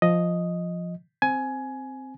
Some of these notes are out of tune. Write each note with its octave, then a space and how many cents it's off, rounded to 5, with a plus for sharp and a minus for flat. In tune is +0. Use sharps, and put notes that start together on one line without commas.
F3 +0 D#5 +0
C4 +0 G#5 +15